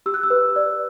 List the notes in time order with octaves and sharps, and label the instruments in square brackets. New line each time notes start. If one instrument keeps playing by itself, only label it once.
[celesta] G4 E6
F#6
E6
B4
D5